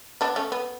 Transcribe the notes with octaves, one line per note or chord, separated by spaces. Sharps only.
B3 D4
A3 C#4
B3